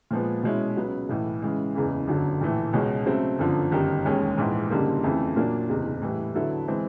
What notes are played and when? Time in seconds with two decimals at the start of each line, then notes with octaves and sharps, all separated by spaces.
0.11 A#2 F3 G#3 B3
0.43 B2 G#3 C#4 E4
0.76 C#2 C#3 F#3 B3
1.09 B1 A2 E3
1.42 C#3 E3 G#3
1.75 F#1 E2 C#3 E3
2.08 G1 F#2 D3 F#3
2.41 A#1 A2 E3 A3
2.73 C#2 B2 G#3 C#4 F#4
3.06 C#3 F#3 A3 C4
3.39 G1 F#2 D3 F3
3.71 G1 F#2 D#3 G3
4.05 E1 D#2 D#3 G#3 C#4
4.38 A#1 G#2 E3
4.70 F#1 F#2 D3 G3 A#3
5.03 F2 C#3 E3 A3
5.36 A#2 F#3 A#3 D4
5.69 F#1 E2 C3
6.02 A2 E3 G3
6.35 D3 F#3 B3 E4 A4
6.68 E3 G#3 C4